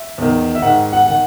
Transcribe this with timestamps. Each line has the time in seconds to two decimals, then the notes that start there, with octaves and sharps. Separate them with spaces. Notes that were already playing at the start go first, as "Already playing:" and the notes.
Already playing: E5
0.18 E2 D#3
0.55 E5
0.62 G#2 D#3 F#5
0.93 F#5
1.07 D#3 F#5